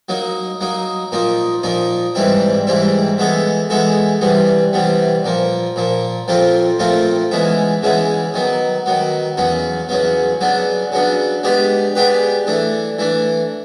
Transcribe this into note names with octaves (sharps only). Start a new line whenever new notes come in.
F#3 A#3 D#4
F#3 A#3 D#4
A#2 F3 A#3 D#4
A#2 F3 A#3 D#4
G#2 E3 G3 C4 E4
G#2 E3 G3 C4 E4
E3 G#3 B3 E4 A4
E3 G#3 B3 E4 A4
C3 E3 G3 B3
C3 E3 G3 B3
A#2 F3 A#3
A#2 F3 A#3
A#2 F3 A3 C4 F4
A#2 F3 A3 C4 F4
C#3 E3 G#3 B3 E4
C#3 E3 G#3 B3 E4
D#3 F#3 B3
D#3 F#3 B3
E2 C#3 F#3 B3
E2 C#3 F#3 B3
C#3 F#3 B3 D4
C#3 F#3 B3 D4
G#3 B3 D4 G4 B4
G#3 B3 D4 G4 B4
E3 A3 D4
E3 A3 D4